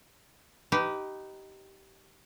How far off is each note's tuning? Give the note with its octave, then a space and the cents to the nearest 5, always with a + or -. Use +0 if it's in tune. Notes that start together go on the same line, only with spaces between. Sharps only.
D#4 +0 G4 -15 B4 +15